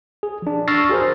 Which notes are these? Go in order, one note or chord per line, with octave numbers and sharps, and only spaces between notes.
G#4
F3 D4
C#6 E6 F6 A6 A#6 C7
F#4 G#4 A#4 C5